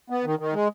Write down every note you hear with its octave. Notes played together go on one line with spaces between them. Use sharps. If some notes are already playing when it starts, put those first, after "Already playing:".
B3
D#3
D#3
G#3